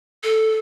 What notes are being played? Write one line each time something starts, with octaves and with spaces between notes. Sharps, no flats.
A4